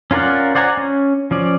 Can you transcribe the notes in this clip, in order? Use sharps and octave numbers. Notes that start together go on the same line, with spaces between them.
C#4 F4 A#4 D5 F#5
C5 D5 F#5 G#5 A#5
C#4
F3 C#4 D5